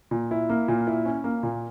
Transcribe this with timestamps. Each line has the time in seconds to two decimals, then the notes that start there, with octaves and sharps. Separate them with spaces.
0.11 A#2
0.31 E4
0.49 A#3
0.68 A#2
0.87 E4
1.05 C#4
1.24 A#3
1.43 A#2